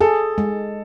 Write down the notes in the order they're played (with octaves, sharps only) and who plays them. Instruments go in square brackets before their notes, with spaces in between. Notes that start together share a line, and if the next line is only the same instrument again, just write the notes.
[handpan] G#4 [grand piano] A4
[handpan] G#3